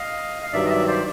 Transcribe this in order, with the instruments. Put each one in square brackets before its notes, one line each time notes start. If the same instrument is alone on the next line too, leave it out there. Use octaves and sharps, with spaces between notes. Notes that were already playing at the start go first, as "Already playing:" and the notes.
Already playing: [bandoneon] D#5 F5
F5
G2 D#3 F#3 D5 E5
D#5
D5 E5
C5 D5